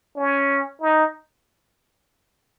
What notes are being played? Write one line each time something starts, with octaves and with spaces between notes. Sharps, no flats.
C#4
D#4